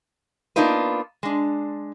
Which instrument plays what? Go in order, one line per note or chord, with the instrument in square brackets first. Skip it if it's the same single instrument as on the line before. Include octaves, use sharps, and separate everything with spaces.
[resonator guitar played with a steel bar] A#3 B3 D4 D#4 F4 B4
G#3 D4